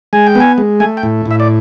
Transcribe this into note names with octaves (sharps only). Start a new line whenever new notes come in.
G#3 G#5
G5
B3
G#5
G#3
A3 G#5
G5
A2
A2
E5
D5